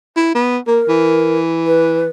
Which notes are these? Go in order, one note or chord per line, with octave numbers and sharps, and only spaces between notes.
E4
B3
A#3 A#4
E3
B4